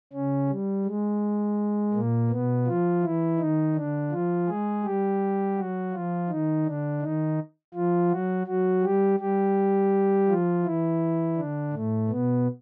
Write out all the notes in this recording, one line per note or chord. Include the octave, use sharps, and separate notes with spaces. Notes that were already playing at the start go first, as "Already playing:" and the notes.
C#3 C#4
G3
G#3
A#2 A#3
B2 B3
F3 F4
E3 E4
D#3 D#4
D3 D4
F3 F4
G#3 G#4
G3 G4
F#3 F#4
F3 F4
D#3 D#4
D3 D4
D#3 D#4
F3 F4
F#3 F#4
F#3 F#4
G3 G4
G3 G4
F3 F4
E3 E4
D3 D4
A2 A3
B2 B3